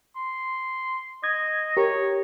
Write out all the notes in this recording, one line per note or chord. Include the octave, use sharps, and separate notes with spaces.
C6
D#5 G#6
G4 A#4 C#5